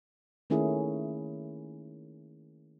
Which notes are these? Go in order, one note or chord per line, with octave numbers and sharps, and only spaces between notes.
D#3 A3 A#3 C#4 E4 G#4